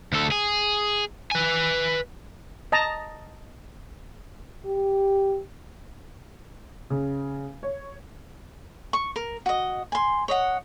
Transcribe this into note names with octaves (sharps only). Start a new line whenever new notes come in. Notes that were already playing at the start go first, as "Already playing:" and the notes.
D2 A4
G#4
B4 G#5
D#5 A5 A#5
G4
C#3
C#5
C#6
A#4
F#4 D#5
G#5 C6
C#5 D#5 F#5